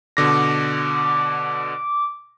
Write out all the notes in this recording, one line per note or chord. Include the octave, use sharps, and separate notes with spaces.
B2 D3 D6 A#6